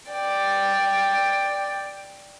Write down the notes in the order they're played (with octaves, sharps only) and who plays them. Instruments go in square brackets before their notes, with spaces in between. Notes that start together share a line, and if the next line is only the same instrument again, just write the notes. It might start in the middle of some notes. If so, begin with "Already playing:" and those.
[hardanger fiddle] D5 G5